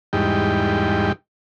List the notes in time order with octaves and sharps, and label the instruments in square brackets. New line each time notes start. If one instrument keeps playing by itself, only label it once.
[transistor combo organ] E2 G#2 G3 D#4 G5